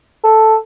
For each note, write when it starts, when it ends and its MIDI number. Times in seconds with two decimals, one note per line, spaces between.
0.24 0.56 69